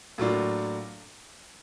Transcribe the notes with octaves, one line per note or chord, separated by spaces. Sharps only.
A2 F#3 A#3 D4 F4